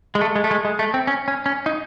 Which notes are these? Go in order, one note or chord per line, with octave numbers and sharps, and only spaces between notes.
G#3
A3
G#3
A3
G#3
G#3
A3
C4
C#4
C#4
C#4
D#4